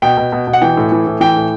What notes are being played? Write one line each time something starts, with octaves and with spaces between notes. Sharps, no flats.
B2 G5
B2
B2
B2
F#5
E3 G5
A2
E3
A2
E3 G5
A2